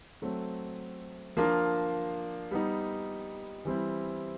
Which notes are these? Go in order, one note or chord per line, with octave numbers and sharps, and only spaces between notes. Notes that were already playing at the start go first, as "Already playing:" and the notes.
F#3 A3 C4
F3 A#3 D4 F4 A#4
G3 B3 D#4
E3 G3 C4 E4